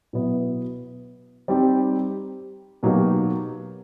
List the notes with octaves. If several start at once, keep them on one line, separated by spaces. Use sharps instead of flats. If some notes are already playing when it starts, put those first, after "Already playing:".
B2 F#3 B3 E4
G3 C4 D#4 G4
B2 F#3 A#3 D#4 G4